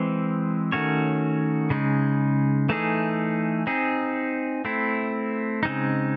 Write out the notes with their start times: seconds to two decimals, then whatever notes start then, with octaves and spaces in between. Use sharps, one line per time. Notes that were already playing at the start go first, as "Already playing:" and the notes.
Already playing: E3 G#3 C4
0.72 D#3 A3 C#4 F#4 C#5
1.70 C#3 G#3 D#4
2.69 E3 A3 D#4 G#4
3.67 C4 D#4 G#4
4.65 A3 C4 E4
5.63 C#3 G#3 C4 D#4